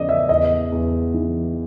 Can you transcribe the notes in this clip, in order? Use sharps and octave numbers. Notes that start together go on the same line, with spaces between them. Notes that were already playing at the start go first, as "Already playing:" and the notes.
Already playing: E2 C#3 F3 D5 D#5
E5
E2 D#5
E2
E3